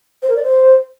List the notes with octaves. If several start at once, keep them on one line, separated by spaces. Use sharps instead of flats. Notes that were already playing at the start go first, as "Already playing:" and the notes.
C5
A#4
D5
C5